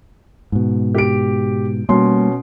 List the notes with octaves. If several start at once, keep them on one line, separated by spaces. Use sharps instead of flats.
G#2 B2
G4 D7
B2 G3 A#3 C#4 C6